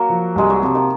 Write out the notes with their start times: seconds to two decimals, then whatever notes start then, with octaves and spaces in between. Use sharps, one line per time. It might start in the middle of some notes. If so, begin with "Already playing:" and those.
Already playing: F#3 A#3
0.10 F3
0.36 C2 G#3
0.50 F#3
0.62 C3 F3
0.75 D#3